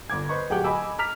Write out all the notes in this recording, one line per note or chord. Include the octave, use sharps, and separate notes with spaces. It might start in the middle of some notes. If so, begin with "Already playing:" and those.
G1 D6 G#6
B4 C5 D#5 C#6
D1 G4 G#4 F#5 G5 D6
D#5 G#5 B5 D6 E6
A#5 D6 F6 B6 F7